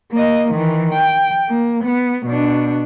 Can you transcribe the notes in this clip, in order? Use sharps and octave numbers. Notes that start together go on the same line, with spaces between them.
A#3 D#5
D#3 E3
G5
A#3
B3
B2 D4